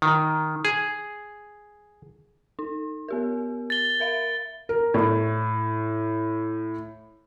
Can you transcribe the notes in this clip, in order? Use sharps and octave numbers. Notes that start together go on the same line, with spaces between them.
D#3
G#4
D#4
B3 G4 A#4
A6 G7
A#4 E5 F5
A#4
A2